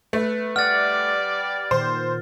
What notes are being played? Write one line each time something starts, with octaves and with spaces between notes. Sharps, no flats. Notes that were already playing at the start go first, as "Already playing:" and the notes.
A3 B4
G3 D5 F#5 F6 A6
A#2 D#3 C5